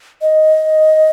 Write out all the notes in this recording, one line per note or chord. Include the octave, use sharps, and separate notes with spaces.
D#5